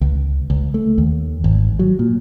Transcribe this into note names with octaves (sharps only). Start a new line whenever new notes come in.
C#2
C#2
A3
D#2
G#1
F#3
A#2